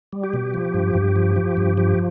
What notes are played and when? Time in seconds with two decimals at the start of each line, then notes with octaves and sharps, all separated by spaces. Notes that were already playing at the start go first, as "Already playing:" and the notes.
0.13 G3
0.24 G4
0.33 B2
0.54 F3
0.74 G2
0.95 G2
1.16 F3
1.36 F3
1.57 G2
1.77 F3 G4